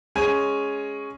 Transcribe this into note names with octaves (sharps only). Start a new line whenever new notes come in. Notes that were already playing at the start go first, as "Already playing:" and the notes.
G#3 C#4 G#5